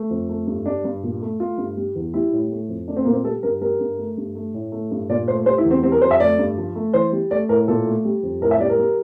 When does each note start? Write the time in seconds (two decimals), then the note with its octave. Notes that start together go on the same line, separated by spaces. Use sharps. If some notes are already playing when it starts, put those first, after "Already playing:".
Already playing: A3
0.10 F2
0.29 A3
0.47 G2
0.66 G3 D4
0.84 G2
1.03 A#2
1.21 A3
1.40 A3 F4
1.58 G2
1.77 G3
1.95 E2
2.14 G3 E4
2.33 A2
2.51 A3
2.69 F2
2.88 A3 D4
2.96 C4
3.05 A#2 A#3
3.13 C4
3.24 G3 A4
3.43 G2 A#4
3.61 G3 A#4
3.80 G2
3.98 A3
4.17 G2
4.35 A3
4.54 A2
4.72 A3
4.91 G2
5.10 A#2 D5
5.28 A3 C5
5.46 G3 C5
5.58 E4
5.65 E2
5.71 C4
5.83 G3 C4
5.92 A#4
6.01 F2 C5
6.11 E5
6.20 A3 D5
6.39 G2
6.57 F3
6.75 A3
6.94 E3 C5
7.12 G3
7.31 A3 D5
7.49 A2 A#4
7.68 A#2 A4
7.86 A3
8.05 G3
8.23 F2
8.42 A2 A#4
8.51 E5
8.60 G3 D5
8.70 A#4
8.78 G3